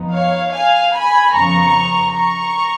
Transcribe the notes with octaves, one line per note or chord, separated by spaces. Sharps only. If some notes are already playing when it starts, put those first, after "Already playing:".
Already playing: F2 F3 B3 D#4
C#5 F5
F5 G#5
G#5 B5
F2 C#3 F3 B3 A#5 C#6
A#5 C#6